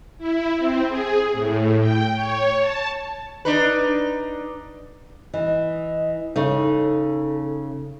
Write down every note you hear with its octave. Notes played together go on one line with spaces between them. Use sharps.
E4
C4
G#4
A2
G5
C#5
A5
D4 D#4 B4
E3 D#5
C#3 D#4 A4